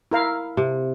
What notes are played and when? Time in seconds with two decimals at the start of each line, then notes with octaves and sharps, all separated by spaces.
0.11 E4 A#4 F5
0.57 C3